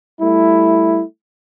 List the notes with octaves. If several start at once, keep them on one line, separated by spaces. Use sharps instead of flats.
G3 A3 E4